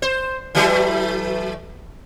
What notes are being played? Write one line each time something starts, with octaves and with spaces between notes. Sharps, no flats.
C5
E3 F#3 A3